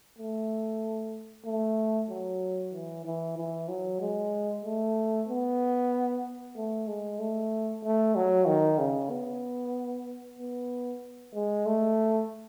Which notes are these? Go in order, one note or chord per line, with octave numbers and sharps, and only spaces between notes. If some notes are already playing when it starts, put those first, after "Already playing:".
A3
A3
F#3
E3
E3
E3
F#3
G#3
A3
B3
A3
G#3
A3
A3
F#3
D#3
C#3
B3
B3
G#3
A3